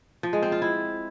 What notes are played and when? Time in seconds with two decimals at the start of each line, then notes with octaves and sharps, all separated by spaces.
0.23 F3
0.33 G#3
0.43 C4
0.52 F4
0.62 E4